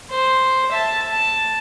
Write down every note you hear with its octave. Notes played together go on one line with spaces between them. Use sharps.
C5
E5 A5
A5